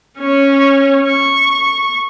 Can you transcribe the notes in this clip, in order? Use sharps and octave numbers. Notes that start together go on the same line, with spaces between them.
C#4 C#5
C#6